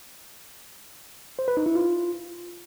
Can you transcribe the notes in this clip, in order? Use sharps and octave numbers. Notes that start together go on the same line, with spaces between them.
C5
B4
D#4
E4
F4